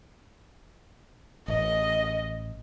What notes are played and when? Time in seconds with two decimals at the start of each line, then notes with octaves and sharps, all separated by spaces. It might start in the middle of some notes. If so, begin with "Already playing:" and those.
1.48 A1 D#5